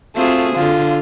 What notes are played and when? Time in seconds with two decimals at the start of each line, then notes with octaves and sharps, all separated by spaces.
0.16 A3 C4 F4 F#4 G#4
0.56 D3 F4